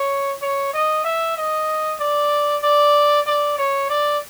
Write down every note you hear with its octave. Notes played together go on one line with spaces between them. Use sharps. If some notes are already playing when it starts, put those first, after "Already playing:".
Already playing: C#5
C#5
D#5
E5
D#5
D5
D5
D5
C#5
D5